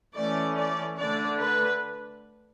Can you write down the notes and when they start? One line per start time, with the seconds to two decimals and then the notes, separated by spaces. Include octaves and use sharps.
0.14 E3 A3 C#4 D5
0.56 D5
0.97 D3 A3 D4 D5
1.40 B4